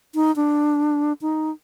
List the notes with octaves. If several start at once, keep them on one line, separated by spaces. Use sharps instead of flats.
D#4
D4
D#4